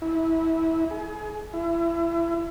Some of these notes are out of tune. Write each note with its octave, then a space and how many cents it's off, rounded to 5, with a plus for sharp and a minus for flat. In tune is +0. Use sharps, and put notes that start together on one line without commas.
E4 -20
G#4 +30
E4 +30